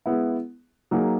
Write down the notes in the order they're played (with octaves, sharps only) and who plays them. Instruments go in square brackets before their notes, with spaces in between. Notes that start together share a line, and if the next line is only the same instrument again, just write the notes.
[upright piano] G#3 B3 E4
F#3 A#3 D#4 G#4